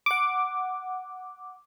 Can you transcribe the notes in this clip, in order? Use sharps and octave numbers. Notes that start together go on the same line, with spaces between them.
F#5 D6